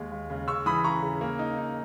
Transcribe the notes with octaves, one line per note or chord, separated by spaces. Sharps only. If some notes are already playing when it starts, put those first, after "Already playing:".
Already playing: D#2 G#3
D#2
C#3
C#3 C#6 E6
E3 B5 D#6
C#3 A#5 C#6
C#3
A#3
D#4
D#4